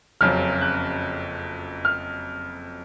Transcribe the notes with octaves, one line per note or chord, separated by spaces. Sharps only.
F#1 F2 C#3 F#3 F6
F#6
F6